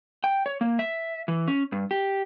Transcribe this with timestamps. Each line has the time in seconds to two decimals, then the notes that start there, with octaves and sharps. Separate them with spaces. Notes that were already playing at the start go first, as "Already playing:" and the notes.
0.24 G5
0.46 C#5
0.61 A#3
0.79 E5
1.28 E3
1.48 C#4
1.72 G2
1.91 G4